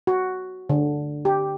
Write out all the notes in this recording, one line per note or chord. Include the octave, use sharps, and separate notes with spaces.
F#4
D3
G4